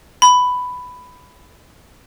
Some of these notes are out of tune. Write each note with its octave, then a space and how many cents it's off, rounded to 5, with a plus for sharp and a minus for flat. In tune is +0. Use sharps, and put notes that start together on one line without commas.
B5 +10